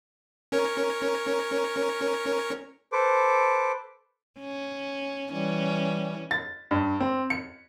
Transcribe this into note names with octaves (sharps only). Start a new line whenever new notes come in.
C#4 A#4 C#5
A4 B4 C5 D6
C#4
E3 G3 C#4
A6
G2
C4
C#7